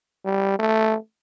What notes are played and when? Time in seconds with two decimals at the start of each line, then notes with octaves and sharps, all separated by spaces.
0.25 G3
0.59 A3